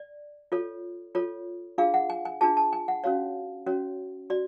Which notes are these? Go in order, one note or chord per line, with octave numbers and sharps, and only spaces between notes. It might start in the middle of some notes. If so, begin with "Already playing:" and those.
Already playing: D5
F4 A4 C#5
F4 A4 C#5
D4 F4 G#4 F5
F#5
G#5
G#5
D4 F4 G#4 A5
A5
G#5
F#5
C#4 F#4 C#5 F5
C#4 F#4 C#5
F#4 D5